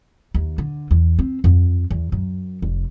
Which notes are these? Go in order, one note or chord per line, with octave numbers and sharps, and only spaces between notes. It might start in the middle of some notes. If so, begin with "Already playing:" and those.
D#2
D3
E2
C4
F2
E2
F#2
F1